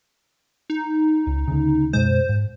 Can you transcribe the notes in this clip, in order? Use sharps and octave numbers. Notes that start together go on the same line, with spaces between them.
D#4
C#2
D2 C#3
F#2 B2 G#3 C5
G#2